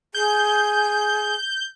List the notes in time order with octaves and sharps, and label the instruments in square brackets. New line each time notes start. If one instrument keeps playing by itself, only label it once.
[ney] G#4 [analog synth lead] G6